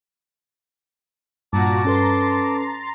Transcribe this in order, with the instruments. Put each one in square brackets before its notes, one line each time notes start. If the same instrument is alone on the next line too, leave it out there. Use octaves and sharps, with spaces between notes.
[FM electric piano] G2 [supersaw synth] A#2 F#4 A#5 [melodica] A5 D6
[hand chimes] C#4 A4 B4 [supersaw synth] A#5 C6 A6